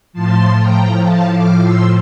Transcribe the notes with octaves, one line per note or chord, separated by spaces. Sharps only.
A2 F3 A5 C6
G5 A#5
F5 A5
D6 F6
C6 E6